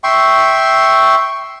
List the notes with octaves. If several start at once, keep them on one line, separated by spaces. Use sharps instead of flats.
E5 G5 C6 C#6